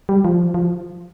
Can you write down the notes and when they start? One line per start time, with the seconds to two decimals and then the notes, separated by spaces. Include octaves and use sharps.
0.09 G3
0.25 F3
0.54 F3